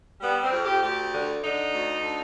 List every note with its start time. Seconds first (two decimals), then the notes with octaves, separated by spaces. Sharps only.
0.20 G3 B3
0.41 C4
0.51 F2
0.62 G4
0.81 D2 G4
1.12 D3
1.42 D3 D#4
1.72 D2
2.02 D3